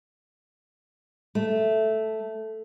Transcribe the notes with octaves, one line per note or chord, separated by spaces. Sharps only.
A3